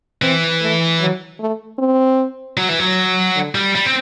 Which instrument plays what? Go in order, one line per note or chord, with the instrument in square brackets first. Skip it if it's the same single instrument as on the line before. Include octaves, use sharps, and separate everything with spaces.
[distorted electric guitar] E3 [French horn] C4
[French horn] A3
F#3
A3
C4
[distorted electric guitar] F#3
E3
F#3
[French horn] D3
[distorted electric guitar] G3
G3
C4